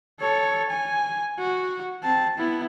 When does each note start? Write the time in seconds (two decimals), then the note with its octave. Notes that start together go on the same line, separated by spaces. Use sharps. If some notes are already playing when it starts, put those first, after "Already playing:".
0.19 A4 C#5
0.70 G#5
1.38 F#4
2.03 C4 A5
2.37 B3 E4